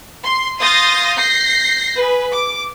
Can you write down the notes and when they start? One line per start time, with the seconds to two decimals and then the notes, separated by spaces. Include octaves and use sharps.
0.22 C6
0.60 F5 C6 D#6 G6 A6 A#6
1.17 G6 A#6 C7
1.96 G#4 B4
2.32 D6